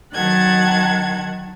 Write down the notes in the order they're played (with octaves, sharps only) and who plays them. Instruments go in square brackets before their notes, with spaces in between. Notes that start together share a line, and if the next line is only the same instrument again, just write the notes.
[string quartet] D#3 F#3 F#5 A5 G#6